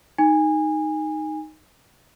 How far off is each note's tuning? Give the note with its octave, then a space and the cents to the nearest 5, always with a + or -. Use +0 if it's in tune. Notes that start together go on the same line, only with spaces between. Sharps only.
D#4 +0 G#5 -20